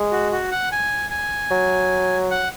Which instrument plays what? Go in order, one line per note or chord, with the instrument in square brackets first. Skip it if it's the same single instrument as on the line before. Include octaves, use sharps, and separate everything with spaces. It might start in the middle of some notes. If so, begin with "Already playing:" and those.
Already playing: [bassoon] G#3
[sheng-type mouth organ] F#4
F#4
F#5
G#5
G#5
[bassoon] F#3
[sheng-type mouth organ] F#5